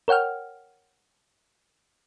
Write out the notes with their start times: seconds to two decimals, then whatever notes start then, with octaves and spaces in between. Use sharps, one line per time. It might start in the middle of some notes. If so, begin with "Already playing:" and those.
0.08 A#4 C#5 F#5 G5 F6